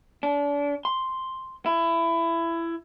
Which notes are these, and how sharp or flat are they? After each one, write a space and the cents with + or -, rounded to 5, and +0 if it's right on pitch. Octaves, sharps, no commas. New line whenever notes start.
D4 -35
C6 +0
E4 +20